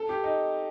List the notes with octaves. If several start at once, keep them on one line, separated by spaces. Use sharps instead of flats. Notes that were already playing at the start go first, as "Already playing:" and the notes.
Already playing: A4
G4
D#4